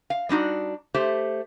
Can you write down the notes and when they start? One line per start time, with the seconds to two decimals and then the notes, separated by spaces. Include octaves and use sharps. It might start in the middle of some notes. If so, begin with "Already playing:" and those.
0.10 F5
0.29 G3 D4 D#4 F#4
0.95 A3 G4 C5